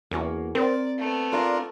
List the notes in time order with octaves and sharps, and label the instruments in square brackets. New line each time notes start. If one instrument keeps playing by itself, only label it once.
[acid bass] E2 [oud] A#3 C#4 F#4
[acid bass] C4 [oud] A#4 C5 [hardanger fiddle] D5
[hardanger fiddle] A3 B3
[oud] D4 D5 F5 [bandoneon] F4 A#4